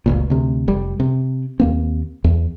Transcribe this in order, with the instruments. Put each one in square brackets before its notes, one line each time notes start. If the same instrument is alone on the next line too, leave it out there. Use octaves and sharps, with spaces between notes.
[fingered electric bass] F#1 C#2 A#2
D2 C3
F1 G3
C3
D#2 A#3 C4
E2